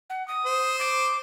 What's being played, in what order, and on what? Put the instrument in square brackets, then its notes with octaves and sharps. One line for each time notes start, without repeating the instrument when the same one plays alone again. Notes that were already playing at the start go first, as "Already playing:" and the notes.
[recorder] F#5
D#6
[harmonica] C5
[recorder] D6